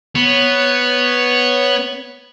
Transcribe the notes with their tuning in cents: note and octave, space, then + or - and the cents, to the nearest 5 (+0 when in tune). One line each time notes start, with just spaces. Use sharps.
B3 +0 C#5 +0